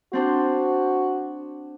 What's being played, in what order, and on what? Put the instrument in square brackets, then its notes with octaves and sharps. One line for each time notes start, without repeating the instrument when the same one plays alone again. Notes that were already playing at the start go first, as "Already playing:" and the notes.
[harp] C4 D4 C5 [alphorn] F#4